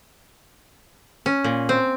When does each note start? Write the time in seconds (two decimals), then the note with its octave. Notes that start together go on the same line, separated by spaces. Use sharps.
1.26 C#4
1.44 A#2
1.69 C4